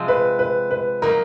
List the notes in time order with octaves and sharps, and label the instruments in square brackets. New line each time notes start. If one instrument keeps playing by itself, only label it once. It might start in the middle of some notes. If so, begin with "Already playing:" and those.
Already playing: [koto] C3 F3 G#3 C4
[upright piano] B4
B4
B4
[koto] F#3 A#3 D#4 [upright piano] A#4